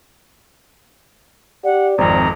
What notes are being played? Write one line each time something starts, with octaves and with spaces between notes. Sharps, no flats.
G4 D5 F#5
G#1 F2 C4 A#5